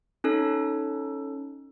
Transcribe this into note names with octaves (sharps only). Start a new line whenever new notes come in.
C#4 D#4 A4